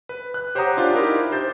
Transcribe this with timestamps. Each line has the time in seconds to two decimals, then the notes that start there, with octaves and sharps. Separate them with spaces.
0.09 B4
0.34 F#6
0.55 G4 C5 C#5 F#5 A#5 D#6
0.77 D4 F4 G4
0.95 D#4 E4 G4 A#4
1.32 C5 G6 A6